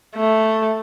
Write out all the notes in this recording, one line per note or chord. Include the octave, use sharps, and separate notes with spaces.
A3